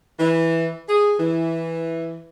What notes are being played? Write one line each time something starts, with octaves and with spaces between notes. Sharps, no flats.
E3
G#4
E3